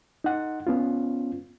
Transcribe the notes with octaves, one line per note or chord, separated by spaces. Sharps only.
D#4 F#5
B3 C#4 F4